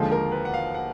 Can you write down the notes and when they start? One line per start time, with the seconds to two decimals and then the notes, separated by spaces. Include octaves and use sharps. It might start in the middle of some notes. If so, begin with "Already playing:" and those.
Already playing: D#2 D3 F3 G#3 A4
0.12 A#4
0.31 B4
0.45 F#5
0.54 F5
0.74 F#5